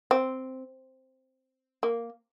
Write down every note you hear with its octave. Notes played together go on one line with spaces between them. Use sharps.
C4
A#3